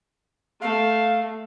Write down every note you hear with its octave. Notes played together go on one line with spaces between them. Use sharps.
A3 F5